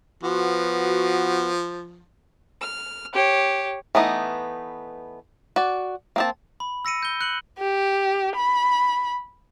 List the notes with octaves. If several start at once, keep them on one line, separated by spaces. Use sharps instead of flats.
F3 B3 F#4
F6
G4 C#5
E3 A3 B3 D#4
F#4 D5
A#3 C4 A5
B5
E6 A#6 C#7 D#7
G6 G7
F#6 C#7 F#7
G4
B5